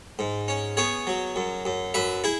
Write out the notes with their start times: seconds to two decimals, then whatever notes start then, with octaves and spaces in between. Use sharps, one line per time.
0.19 G#2
0.48 C#4
0.77 B3 G#4 C#5
1.07 F#3
1.36 F#2
1.65 F#2
1.94 F#2 B4 E5
2.24 E4 G#4